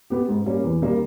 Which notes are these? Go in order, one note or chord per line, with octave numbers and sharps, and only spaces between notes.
B3 G4
G#2
G3 A#3 C#4
E2
D#3 G3 A#3